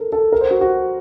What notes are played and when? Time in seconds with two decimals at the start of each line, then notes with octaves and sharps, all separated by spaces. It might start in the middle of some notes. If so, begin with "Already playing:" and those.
Already playing: A4 A#4
0.12 A4
0.32 A#4
0.41 C5
0.51 F#4
0.61 F#4